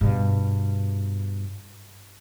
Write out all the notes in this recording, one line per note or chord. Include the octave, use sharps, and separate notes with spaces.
G2 B2